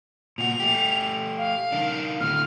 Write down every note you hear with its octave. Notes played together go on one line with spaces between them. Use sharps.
A#2 F#4 F7
A3 G4
F5
D#3 D4
A2 D3 F6